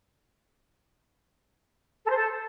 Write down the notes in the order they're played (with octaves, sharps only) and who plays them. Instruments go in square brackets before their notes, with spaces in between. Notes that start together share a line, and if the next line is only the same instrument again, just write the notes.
[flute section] A4
C5
A4